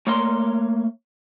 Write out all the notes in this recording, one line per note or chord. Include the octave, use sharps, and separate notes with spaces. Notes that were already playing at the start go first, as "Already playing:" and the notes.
A3 A#3 C#5 A#5 C6